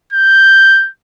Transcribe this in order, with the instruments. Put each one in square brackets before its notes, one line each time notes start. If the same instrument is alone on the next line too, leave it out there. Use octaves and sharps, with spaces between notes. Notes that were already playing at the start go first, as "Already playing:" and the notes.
[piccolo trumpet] G6